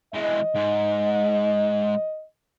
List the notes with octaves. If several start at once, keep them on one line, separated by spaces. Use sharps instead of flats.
E3 G#3 D#5
G#2